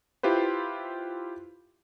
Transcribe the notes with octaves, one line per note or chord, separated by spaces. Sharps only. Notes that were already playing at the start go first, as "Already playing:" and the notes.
E4 F4 G4 B4 C5